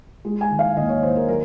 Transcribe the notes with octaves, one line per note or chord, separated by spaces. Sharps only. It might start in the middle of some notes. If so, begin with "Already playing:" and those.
G#3
G#5
D#3
F5
D#2 D#5
C#5
D#2 C5
A#4
F#3 A#4